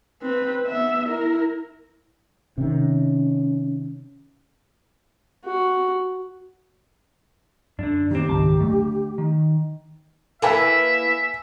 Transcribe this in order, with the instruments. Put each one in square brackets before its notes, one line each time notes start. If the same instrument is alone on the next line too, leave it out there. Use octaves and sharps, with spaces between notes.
[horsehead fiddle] C4 B4
B3 E5
E4 A#4
[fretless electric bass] C3 D#3 [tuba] C#4
[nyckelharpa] F#4
[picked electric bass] F#2 [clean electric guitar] D3 D4
[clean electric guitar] A#2 C4 [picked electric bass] D#3 [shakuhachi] G4
[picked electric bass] G#1 C#2 F#2 [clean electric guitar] D#3 A5
[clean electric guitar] D2 [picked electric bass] F#3 A3
[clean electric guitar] D#3
[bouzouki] A#3 E4 B4 [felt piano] A4 G#5 [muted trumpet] E5